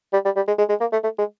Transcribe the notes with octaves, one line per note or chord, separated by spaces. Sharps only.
G3
G3
G3
G#3
G#3
G#3
A#3
A3
A3
G#3